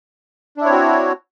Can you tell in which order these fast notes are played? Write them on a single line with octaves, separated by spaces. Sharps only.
D4 E4 C#5 C4 F#4